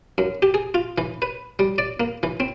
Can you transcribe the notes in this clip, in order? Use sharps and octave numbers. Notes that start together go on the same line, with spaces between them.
F#2
G4
G#4
F4
E3
B4
G3
D5
A#3
E3
C4